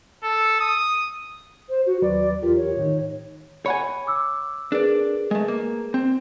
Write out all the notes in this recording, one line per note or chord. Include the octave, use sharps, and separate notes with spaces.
A4
D#6
C5
F#4
D#2 F#3 B4 D5
E2 F4 G4 A#4
C#5
A2 D#3 D#4
C#5 F#5 G#5 B5
D6 E6
D4 G#4 A#4 B4 D5
G#3 A3
A#3
C4